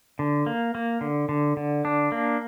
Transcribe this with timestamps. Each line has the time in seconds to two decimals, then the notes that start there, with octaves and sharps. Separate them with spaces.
0.19 D3
0.46 A#3
0.75 A#3
1.01 D3
1.29 D3
1.57 D3
1.85 D4
2.12 A#3